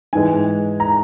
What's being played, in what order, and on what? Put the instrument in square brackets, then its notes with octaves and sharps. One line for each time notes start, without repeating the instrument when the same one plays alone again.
[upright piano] G#2 E3 G#3 G#5
A#5